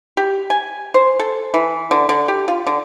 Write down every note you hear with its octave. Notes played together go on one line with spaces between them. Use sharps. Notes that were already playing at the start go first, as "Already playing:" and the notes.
G4
G#5
C5
A4
E3
D3
D3
G4
F4
D3